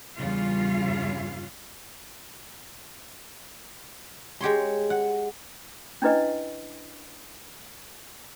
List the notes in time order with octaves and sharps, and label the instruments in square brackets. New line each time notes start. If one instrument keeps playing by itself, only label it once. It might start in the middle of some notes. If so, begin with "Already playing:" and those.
[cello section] E2 G2 C#3 G3 F4 F5
[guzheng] G#3 G4 C#5 C6
F#5
[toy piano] C#4 D4 E4 B4 D#5